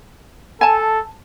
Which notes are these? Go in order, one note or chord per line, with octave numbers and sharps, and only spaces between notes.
A4 G#5 A5